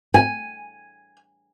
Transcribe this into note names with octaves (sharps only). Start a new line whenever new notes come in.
G#5